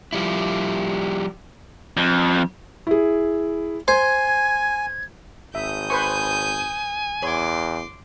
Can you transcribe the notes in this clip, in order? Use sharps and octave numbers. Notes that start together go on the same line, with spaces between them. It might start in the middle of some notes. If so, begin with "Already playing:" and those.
F3 G3 E4
F2
E4 G#4
C5 G#5 G#6
G#1 E5 D#6 G6
B4 C5 G#5 C#6
E2 C#5 C6 D6